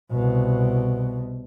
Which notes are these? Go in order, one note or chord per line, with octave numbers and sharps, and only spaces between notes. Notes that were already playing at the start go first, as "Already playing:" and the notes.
C2 B2